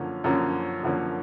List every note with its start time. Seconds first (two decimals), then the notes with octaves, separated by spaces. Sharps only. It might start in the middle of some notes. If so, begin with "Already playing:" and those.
Already playing: F#2 D3 F3 A#3 C#4
0.24 F#2 D3 F3 A#3 C#4
0.83 F#2 D3 F3 A#3 C#4